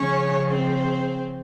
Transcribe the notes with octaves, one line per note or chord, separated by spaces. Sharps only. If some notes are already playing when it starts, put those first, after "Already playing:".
Already playing: C#3 F3 G#3 C#4 C#5
C4 C5